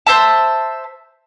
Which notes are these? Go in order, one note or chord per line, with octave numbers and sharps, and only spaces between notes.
C5 E5 A5